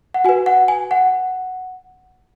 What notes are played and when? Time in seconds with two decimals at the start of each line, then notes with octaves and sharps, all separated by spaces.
0.14 F#5
0.24 F#4 B4 G#5
0.46 F#5
0.68 G#5
0.91 F#5